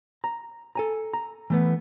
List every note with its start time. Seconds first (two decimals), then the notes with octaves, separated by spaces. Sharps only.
0.24 A#5
0.75 A4 G#5 A#5
1.13 A#5
1.50 E3 A3 B3